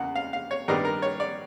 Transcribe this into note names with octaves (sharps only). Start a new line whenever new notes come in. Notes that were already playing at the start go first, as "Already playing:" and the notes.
Already playing: E2 C#3 A#3 F#5
F5
F5
C#5
G2 D#3 G3 B3 D4 A#4
A#4
C#5
D5